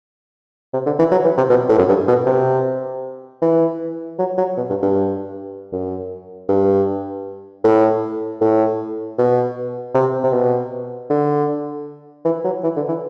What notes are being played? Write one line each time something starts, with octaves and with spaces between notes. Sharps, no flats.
C3
D3
E3
F#3
E3
C3
B2
A2
F#2
G2
B2
C3
E3
F#3
F#3
B2
G2
G2
F#2
G2
A2
A2
B2
C3
C3
B2
D3
E3
F#3
E3
D3
E3